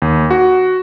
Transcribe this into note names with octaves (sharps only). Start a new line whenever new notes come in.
D#2
F#4